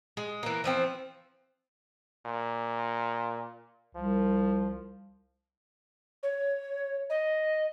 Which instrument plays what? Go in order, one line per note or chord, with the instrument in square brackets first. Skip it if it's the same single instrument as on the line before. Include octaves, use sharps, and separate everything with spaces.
[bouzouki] G#3
E3 A#3
E3 F3 C4
[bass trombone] A#2
[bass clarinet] C2 [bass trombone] F3
[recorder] C#5
D#5